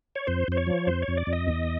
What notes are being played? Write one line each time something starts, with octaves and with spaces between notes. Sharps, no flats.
C#5
F2 C5
F2 C5
C#5
F3
F2 C5
C#5
F2
D5
F2
D#5
E2